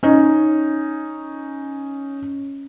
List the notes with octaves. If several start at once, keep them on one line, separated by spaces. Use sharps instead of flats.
C#4 D#4